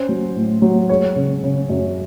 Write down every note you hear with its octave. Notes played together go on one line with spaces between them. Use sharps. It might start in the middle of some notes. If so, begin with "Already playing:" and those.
Already playing: C#4 C5
F#3
A2
F#3
G#3 C#5
C#3
C#3
F#2